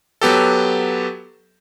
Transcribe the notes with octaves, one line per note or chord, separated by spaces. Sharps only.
F#3 B3 G4 A4